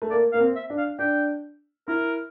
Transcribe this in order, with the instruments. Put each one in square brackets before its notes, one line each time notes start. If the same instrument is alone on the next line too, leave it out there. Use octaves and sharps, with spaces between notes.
[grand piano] A3
[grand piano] A#3 [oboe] D5
[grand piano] A#3 [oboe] F5
[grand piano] C4
[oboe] E5
[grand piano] D4
[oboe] F5
[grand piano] D4 [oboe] G5
[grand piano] E4 [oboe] A#4